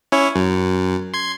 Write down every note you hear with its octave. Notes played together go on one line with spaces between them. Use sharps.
C#4 E4 C#5
F#2
C6 G#6